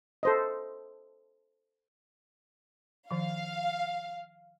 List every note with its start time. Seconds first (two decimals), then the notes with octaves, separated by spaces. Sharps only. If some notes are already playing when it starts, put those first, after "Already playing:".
0.23 A4 C5 D#5
3.11 D#3 F3 F5